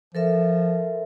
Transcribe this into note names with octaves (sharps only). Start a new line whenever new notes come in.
F3 A4 A#4 E5